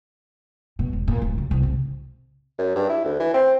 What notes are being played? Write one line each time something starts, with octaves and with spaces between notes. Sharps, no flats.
B2
E1
A#2
D1
C#2
C2
C3
F#2
G2
E4
D2
E3
C4